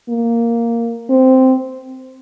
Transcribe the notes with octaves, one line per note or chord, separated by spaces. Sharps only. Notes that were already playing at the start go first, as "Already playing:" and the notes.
A#3
C4